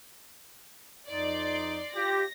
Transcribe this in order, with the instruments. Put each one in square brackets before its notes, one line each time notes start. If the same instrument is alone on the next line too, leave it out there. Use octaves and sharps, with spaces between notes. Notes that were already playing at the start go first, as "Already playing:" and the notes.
[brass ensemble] F2 D#4 [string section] D5 C6
[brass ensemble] F4 G4 [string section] A#6